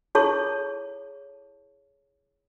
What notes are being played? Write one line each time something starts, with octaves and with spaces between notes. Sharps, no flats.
E4 G#4 A4 C#5 A5 C#6